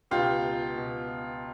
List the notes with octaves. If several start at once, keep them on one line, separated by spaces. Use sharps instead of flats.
C#2 B2 F4 G4
B2